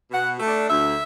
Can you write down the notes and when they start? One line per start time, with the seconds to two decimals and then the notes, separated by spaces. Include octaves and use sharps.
0.11 B2 F#5
0.40 A3 D4
0.68 D2 E5